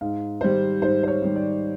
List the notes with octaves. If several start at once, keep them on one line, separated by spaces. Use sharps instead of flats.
G#2 F5
D#3 G3 C5
G#2 C5
C5
C#5
D#3 G3
D5